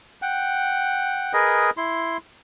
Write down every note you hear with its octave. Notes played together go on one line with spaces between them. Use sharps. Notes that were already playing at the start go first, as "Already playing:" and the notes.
F#5 G5
G#4 A#4 B4 D#5
E4 C6